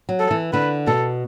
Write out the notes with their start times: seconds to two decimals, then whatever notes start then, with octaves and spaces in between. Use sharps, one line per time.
0.09 F#3
0.20 A4
0.31 E3
0.53 D3 B4
0.87 B2 A4